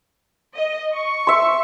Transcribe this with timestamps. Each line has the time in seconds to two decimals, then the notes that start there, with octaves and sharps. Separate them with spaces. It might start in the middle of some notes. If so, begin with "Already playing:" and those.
0.54 D#5
0.94 C#6
1.27 E5 C6